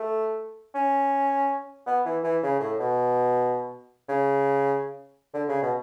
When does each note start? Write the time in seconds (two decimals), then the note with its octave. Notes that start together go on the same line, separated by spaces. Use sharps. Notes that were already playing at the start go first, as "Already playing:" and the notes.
Already playing: A3
0.75 C#4
1.87 B3
2.05 E3
2.24 E3
2.43 C#3
2.60 A2
2.79 B2
4.08 C#3
5.34 D3
5.48 C#3
5.62 B2